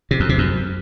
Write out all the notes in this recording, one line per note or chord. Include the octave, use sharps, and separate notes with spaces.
C3
F2
C3
F#2